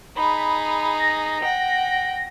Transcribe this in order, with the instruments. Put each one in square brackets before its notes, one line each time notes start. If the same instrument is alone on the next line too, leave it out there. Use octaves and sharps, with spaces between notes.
[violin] D#4 G#4 [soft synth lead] B5
[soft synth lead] A#6
[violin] F#5 G5